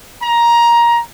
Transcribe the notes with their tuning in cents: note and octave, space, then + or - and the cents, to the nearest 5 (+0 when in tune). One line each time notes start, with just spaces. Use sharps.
A#5 +15